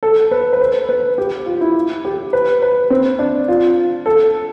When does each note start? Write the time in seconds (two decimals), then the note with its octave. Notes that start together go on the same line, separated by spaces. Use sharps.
0.03 A4
0.31 B4
0.53 B4
0.60 C5
0.89 B4
1.18 G4
1.46 F4
1.61 E4
2.05 G4
2.33 B4
2.62 B4
2.90 C4
3.19 D4
3.48 F4
4.06 A4